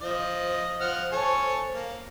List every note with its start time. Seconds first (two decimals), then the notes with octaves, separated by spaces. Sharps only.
0.01 F3 C5 D#5
0.80 F3 C5 F#5 F6
1.12 A4 C#5 G#5
1.73 A#3